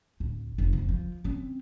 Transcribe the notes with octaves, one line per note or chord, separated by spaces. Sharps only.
D1
F1
C3
F3
C4 C#4